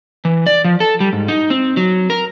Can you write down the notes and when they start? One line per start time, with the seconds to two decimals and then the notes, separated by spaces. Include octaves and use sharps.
0.25 E3
0.47 D5
0.64 F3
0.80 A4
1.00 G3
1.13 G#2
1.28 D#4
1.50 C4
1.77 F#3
2.10 A#4